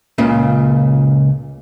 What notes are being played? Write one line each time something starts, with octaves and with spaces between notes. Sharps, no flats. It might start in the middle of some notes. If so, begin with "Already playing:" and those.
C#2 A#2 C#3